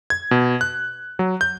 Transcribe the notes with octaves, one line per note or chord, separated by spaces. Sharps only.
G#6
B2
F#6
F#3
G6